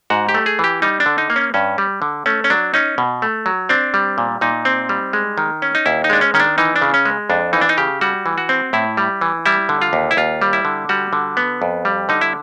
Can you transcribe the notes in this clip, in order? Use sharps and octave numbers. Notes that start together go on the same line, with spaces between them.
G#2 F#4
G4
A3
G#4
E3 G4
G3 D#4
D4
D3
D#4
A#3
C#4
G2 C#4
G3
D3
A3 C#4
C#4
F#3 D4
C#4 D#4
B2
A3
F#3
C4 D4
G3
A#2
A#2 D#4
C4
G3
G#3
D#3
C#4
D#4
D#2 E4
D#4
G#3 D4
C#4
D#3 C#4
D4
E3 D#4
D4
C#3
C#4
G#3
F2 D4
E3 D#4
D4
D#4
C#3 G4
G3 F#4
E3
F#4
C4
A2 E4
G3
E3
G3 E4
D3
F4
D#2
E4
D#2 F4
G3
E4
D3
G3 F#4
D3
B3
F2
G3
D3 D#4
E4